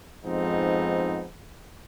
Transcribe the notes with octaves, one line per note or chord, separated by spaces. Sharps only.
F2 G#2 F3 B3 C4 D#4